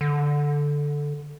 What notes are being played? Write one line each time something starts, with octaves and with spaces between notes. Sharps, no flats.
D3